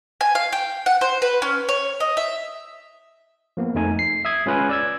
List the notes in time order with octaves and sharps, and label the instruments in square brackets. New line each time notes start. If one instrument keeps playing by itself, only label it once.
[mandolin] G#5
F5
G5
F#5
C5
B4
C#4
C#5
D#5
E5
[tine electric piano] F3 A#3 B3
F2 A3 D#4 G#5
C7
E5 D#6 G#6
G#3 C#4 F4 B4 F5 G#5
D5 E6 G#6